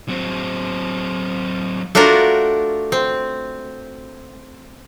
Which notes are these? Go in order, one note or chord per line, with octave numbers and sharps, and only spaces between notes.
F#3 C4
A3 D4 F4 F#4 A#4
C4